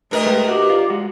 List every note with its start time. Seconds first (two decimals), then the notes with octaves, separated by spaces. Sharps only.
0.11 G2 A3 A#4 D#5
0.26 G#3 A#3 G4
0.48 F#4 G4
0.70 F4 D5
0.90 G#3 F#4